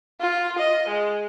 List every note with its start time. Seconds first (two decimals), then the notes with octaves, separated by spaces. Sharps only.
0.21 F4
0.58 D#5
0.88 G#3